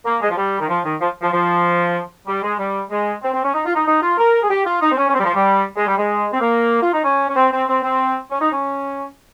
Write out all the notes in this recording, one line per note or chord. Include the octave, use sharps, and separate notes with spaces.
A#3
G#3
F3
G3
D#3
F3
D#3
F3
F3
F3
G3
G#3
G3
G#3
C4
C4
C#4
D#4
F4
D#4
D#4
F4
A#4
G#4
G4
F4
D#4
C4
C#4
C#4
C4
G3
F3
G3
G#3
G3
G#3
C4
A#3
F4
D#4
C#4
C#4
C4
C4
C4
C4
C#4
D#4
C#4